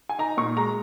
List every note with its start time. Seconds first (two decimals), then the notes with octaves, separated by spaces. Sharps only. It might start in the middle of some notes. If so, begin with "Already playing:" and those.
0.09 G#5
0.19 D#4 A#5
0.37 A#2 C#6
0.57 G#3 A#5